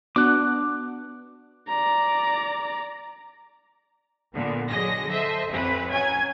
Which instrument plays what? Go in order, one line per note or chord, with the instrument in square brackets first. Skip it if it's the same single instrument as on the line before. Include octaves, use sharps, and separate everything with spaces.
[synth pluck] B3 D4 F#4 [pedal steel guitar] D6 F#6
[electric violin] D5 A#5
[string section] A#2 D3 B3
D3 F#3 G#4 D#5 A#6
A4 C5 D#5 E5
A1 F2 E3 C4 B4
F#3 C#4 G#5 G#6